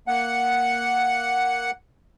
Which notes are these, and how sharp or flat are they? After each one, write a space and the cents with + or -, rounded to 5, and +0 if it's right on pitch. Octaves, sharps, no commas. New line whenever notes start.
A#3 +0 F#5 +0